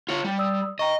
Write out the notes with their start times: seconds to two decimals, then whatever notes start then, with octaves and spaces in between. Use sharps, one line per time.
0.09 F4 C#5 C#7
0.24 G3
0.38 D5 D#6 E6
0.79 D#5 G5 A#5 C#6